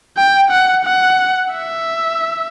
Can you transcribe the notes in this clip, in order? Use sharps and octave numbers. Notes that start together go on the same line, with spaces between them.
G5
F#5
F#5
E5